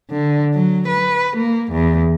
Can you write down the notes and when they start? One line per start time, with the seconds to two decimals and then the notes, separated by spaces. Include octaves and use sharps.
0.11 D3
0.54 F#3
0.88 B4
1.37 A#3
1.72 E2